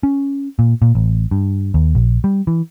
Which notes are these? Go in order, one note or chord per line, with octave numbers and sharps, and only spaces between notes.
C#4
A#2
A#2
A1
G2
D#2
A#1
G3
E3